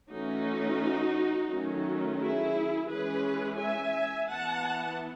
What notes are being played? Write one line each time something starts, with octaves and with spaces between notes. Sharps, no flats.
E3 A3 C#4 D#4 F#4
D#3 F#3 A3 C#4
E4 G#4
E3 G#3 C#4 G#4 B4
E5 G#5
E3 B3 F#5 A5